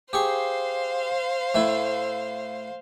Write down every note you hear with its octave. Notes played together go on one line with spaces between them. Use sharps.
G4 G#4 C5 F5 C#6
A2 A3 E4